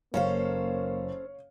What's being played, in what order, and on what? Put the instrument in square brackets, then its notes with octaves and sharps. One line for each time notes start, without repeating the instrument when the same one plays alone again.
[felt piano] F#1 [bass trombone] A#3 [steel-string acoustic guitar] C#4 A4 C5 [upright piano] C#5 F5